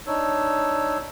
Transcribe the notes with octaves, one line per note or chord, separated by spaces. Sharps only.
D4 D#4 C#5 E6